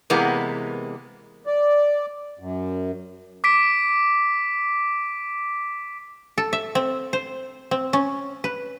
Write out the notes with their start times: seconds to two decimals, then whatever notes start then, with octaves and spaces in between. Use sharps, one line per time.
0.10 C3 E3 G#3 A#3 B3
1.47 D5
2.39 F#2
3.44 D6 B6 D7
6.38 A4
6.53 E5
6.75 C4
7.13 C5
7.71 C4
7.93 C#4
8.44 B4